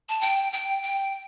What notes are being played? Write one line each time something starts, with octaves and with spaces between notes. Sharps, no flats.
A5
G5
G5
G5